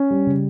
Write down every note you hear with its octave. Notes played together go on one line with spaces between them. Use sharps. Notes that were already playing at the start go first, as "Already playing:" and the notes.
Already playing: C#4
G3
C#3